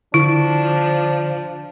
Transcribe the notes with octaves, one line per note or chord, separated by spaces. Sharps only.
D3 F3 D4 E4